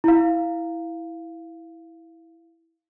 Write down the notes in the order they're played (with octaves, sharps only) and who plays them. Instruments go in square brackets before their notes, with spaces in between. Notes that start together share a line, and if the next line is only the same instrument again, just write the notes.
[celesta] E4 F5